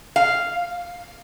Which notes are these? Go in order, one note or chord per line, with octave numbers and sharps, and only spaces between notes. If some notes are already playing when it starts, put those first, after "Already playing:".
F5